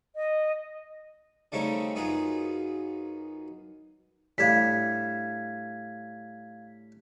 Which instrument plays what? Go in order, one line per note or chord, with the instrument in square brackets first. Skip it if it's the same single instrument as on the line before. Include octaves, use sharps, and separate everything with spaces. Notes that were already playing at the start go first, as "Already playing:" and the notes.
[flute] D#5
[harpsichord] C#3 G3 A3 C4 C#4 D#4
F#2 B3 D#4 F4 G#4
[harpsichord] A2 G3 D4 [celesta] F5 G#6 B6